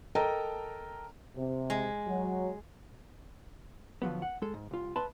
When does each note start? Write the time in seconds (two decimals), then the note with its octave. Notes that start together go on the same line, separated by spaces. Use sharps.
0.15 A4 A#4 D#5 G5 A5 A#5
1.36 C3
1.70 G#3
2.07 F#3
4.02 D3 F3 F#3 B3
4.22 F#5
4.42 G#3 A4
4.54 G#2
4.71 C2 F4
4.96 B4 E5 A5 B5 C6